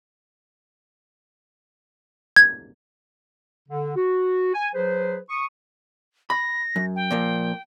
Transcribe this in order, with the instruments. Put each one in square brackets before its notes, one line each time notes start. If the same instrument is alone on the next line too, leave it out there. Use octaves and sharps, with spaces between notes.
[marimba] G#6
[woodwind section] D3
F#4
G#5
F#3 G#4 B4 C5
C#6 D#6
[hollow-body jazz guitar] B5 [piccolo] A#6
[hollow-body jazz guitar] F#2
[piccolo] G5
[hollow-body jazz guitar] A#2 F3 A#3